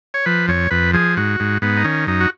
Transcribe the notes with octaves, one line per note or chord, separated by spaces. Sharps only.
C#5
F3 B4
F2 C#5
F2 B4
F3 G#4
G#2 F#4
G#2
G#2 B3
D#4
D#3 C#4
F#2 D#4
F#4